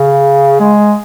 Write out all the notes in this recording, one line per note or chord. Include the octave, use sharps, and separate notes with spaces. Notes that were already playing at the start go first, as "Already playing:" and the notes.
Already playing: C#3
G#3